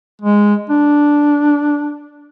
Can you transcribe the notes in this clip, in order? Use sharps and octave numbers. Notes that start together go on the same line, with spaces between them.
G#3
D4